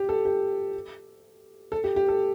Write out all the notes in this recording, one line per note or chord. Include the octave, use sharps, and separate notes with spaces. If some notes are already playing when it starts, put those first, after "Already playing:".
Already playing: G4
A4
G4
A4
G4
G4
A4